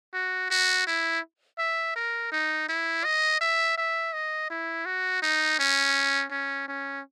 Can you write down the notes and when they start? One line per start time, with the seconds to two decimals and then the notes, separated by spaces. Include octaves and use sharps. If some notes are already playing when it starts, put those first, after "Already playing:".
0.14 F#4
0.51 F#4
0.87 E4
1.59 E5
1.96 A#4
2.32 D#4
2.69 E4
3.05 D#5
3.41 E5
3.78 E5
4.14 D#5
4.50 E4
4.86 F#4
5.22 D#4
5.59 C#4
6.32 C#4
6.68 C#4